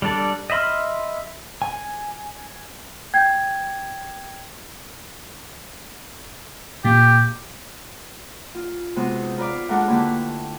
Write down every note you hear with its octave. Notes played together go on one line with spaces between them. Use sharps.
G3 D4 A4 D5
D#5 E5 B5 C6 F6
G#5
G5 G6 G#6
A#2 G4
F4
C3 G#3 B3 F#4
D#4
F4 A#4 B4 D5 F5
G#3 D4 A4 A#4 F5 F#5
D3 A3 A#3 E4 G4 B4